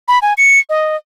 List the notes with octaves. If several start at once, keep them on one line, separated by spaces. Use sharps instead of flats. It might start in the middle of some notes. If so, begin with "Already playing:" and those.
B5
G#5
C#7
D#5